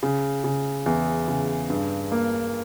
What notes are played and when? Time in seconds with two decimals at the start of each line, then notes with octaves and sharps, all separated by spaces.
0.03 C#3
0.44 C#3
0.86 E2
1.28 C#3
1.70 G2
2.12 A#3